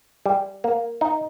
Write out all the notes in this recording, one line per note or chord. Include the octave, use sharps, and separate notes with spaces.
G3
A#3
D#4